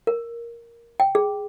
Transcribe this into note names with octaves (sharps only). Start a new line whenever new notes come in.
A#4
G5
G#4